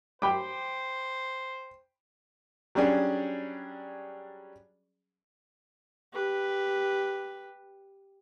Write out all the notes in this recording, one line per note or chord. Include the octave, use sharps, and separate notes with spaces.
C5 G5 B5 D6
F#3 G3 C#4 D4 G#4
G4 B4